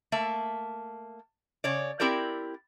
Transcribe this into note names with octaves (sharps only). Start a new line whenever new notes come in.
A3 A#3 E5
C#3 C#5 D5
C4 E4 G4 A#4 D5